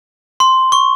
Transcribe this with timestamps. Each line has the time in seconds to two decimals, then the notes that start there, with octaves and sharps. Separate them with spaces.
0.40 C6
0.72 C#6